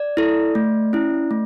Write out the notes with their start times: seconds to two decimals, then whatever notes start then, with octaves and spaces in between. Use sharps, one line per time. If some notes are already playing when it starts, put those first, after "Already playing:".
Already playing: D5
0.17 E4 A4
0.55 A3
0.93 C#4 E4
1.31 A3